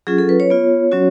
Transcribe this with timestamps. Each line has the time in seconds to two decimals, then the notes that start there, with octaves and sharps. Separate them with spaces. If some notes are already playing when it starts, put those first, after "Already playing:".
0.07 F#3 C#4 F4 G#4
0.18 A4
0.29 B4
0.40 C#5
0.50 B3 F4
0.92 F#3 C#4 F#4